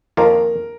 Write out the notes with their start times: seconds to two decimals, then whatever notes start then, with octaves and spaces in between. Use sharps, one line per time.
0.17 F2 D#3 A#3 F4 A#4